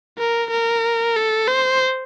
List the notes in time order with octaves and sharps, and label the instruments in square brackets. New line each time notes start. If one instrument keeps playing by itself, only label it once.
[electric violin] A#4
A#4
A4
C5